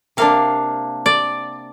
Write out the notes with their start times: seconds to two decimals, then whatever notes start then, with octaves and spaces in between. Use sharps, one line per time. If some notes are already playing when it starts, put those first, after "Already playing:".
0.17 C3 A#3 D4 F5
1.06 D5